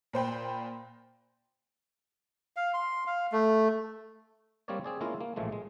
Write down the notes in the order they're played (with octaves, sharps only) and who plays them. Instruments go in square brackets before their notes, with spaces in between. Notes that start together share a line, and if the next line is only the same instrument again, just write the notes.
[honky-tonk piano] A#2 C5 G5 B5
[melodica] F5
C6
F5
A3
[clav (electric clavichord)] G3 A#3 C4 A#4 C#5 D5
C4 G#4 D5
G#3 A#3 C#4 E4 F4 A#4
A#3
A1 A#2 F3 G#3 A3
G#3